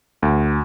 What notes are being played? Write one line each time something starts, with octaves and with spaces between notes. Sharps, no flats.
D2